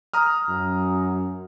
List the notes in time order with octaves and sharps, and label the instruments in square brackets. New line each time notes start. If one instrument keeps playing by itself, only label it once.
[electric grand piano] A#5 D#6 F6
[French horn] F#2